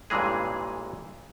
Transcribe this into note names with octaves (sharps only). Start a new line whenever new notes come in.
A1 G2 A#2 E3 G#3 G#4